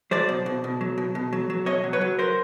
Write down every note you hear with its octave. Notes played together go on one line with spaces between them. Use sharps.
F#3 C5 D5
B2
B2
B2
F#3
B2
B2
F#3
F#3
B2 C#5 D#5
F#3
B4 C#5
F#3
A#4 C5